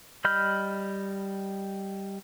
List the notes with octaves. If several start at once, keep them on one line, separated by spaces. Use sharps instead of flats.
G3 D#5 B5 F6 G6